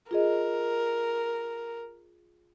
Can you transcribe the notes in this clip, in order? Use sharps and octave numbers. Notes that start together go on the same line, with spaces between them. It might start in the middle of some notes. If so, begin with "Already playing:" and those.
F4 G#4 A#4 D#5